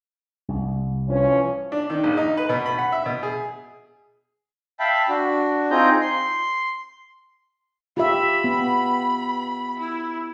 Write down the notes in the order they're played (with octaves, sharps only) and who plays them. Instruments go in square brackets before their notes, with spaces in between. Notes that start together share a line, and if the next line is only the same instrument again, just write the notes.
[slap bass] C2
[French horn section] E3 F3 C#4
[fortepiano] D4
D#3
A#1
D#4
B4
B2
B5
F#5
E5
B2
G#4
[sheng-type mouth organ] E5 F5 G5 A5 B5
D4 F#4
C4 D#4 F4 G#4 A#5 G6
C6
[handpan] F4 G4 E5 [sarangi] B5
[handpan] B3
[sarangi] E4